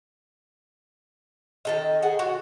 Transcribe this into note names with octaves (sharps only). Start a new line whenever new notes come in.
D#3 A4 D#5
G#4 F#5
F#4